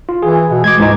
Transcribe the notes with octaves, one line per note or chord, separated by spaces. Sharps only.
F4
E3 G#4
B2
G#3 D6 G#6
C#2 G#2 D#4